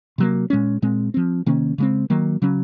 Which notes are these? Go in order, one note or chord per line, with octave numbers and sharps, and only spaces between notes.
C3 F#3 A#3
A#2 G#3 C#4
A#2 G#3 C4
F3 C4
C3 D#3 A#3 C#4
C#3 G#3 C4
D#3 F#3 A#3
C#3 F#3 C#4